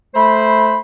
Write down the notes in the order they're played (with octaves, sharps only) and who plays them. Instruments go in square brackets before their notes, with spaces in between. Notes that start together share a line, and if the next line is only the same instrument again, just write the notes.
[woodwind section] A3 C5 B5